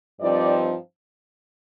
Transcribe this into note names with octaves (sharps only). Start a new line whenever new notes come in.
G2 F3 C4 D#4 D5